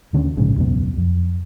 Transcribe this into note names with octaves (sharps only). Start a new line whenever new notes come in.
D#2 D3 B3 C#4
A#1 G#2 C#3
E1 C#2 F#2 B3
F2